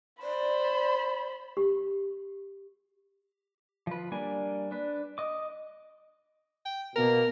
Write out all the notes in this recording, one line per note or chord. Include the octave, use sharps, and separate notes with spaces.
C5 D5 B5
G4
F3 B4
G3 A#3 D4 G#5
D4 B4
D#5 D6
G5
B2 A#3 A#4